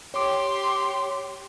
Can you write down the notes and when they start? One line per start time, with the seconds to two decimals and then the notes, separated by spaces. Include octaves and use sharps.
0.14 G4 C#5 C6 D6